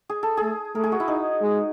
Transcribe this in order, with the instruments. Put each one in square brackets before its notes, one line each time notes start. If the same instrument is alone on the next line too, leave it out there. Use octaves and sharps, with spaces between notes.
[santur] G#4
A4
[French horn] A3 [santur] G#4
[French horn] A3 [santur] A#4
[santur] G#4
F#4
E4
D#4
[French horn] G#3